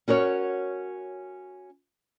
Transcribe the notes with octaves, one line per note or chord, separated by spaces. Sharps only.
C#4 F#4 A#4 C#5